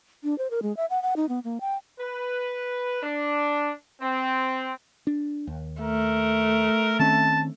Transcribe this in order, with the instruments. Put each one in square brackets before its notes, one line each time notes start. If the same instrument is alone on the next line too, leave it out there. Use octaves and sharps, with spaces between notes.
[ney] D4
C5
A#4
G#3
E5
F#5
F#5
D#4
B3
A#3
G5
[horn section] B4
D4
C4
[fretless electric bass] D4
D#2
[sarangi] A3 [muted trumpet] A#4
[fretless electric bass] D#3 C4 C#4 [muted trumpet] A5